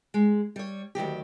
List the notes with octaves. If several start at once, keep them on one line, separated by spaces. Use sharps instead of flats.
G#3
G3 C#5
D2 D#3 F#3 G4